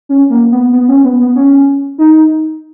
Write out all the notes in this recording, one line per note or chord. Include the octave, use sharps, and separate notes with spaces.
C#4
A#3
B3
B3
C#4
B3
B3
C#4
D#4